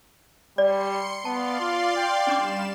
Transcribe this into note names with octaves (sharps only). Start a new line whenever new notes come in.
G3 D5 C6 C#7
B3 D5 F5 A5 C6
F4
G5
G3 C#4 D4 D6 E7